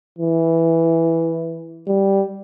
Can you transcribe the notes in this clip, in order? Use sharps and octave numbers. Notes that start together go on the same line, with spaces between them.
E3
G3